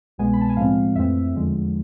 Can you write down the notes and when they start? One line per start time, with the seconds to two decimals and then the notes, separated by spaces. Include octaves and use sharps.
0.18 C2 B2 G#3 B3 G#5
0.33 B5
0.41 A5
0.50 G#5
0.57 A2 F3 G#3 C4 F5
0.96 F2 E3 A3 C4 E5
1.34 E2 D3 F3 G#3